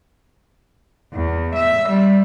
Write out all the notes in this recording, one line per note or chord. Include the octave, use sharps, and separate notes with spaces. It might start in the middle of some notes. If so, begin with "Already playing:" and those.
E2
E5
G3